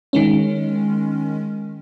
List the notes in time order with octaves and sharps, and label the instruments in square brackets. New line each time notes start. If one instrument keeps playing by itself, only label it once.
[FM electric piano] D#3 G#3 C#4